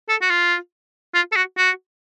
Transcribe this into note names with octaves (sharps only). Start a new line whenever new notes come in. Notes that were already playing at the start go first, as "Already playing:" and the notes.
A4
F#4
F4
F4
A4
F#4
F#4